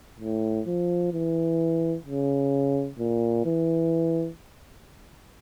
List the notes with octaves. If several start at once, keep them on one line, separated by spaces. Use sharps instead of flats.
A2
F3
E3
C#3
A#2
E3